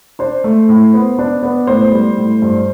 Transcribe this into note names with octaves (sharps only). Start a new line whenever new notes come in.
D4 C5
A3
A2
B3
D4
B3
A2 C5
G3
A2
G2